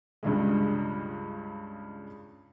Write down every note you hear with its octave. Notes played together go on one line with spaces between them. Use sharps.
C#2 G2 C#3 G#3